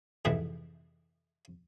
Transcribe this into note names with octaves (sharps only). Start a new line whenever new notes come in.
F2 G#2 C3 E3